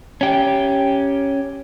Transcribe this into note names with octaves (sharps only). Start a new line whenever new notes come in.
C#4 G4